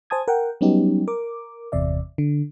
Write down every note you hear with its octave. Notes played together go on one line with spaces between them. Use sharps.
C5 G#5 A5 D#6 G#6
A#4 F#5 G5
F#3 G3 B3 C#4 D#4 G4
A#4 D6
G1 E2 C3 D5 E5
D3